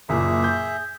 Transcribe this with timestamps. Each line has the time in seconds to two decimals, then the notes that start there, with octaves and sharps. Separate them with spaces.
0.09 F#1 A#2 G#4 E5
0.44 G6